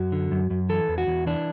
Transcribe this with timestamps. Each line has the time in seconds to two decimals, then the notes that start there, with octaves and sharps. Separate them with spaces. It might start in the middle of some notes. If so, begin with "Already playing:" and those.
Already playing: F#2 F#4
0.12 D3
0.31 F#2
0.50 F#2
0.69 E3 A4
0.88 E2
0.98 F#4
1.07 E2
1.26 E3 D4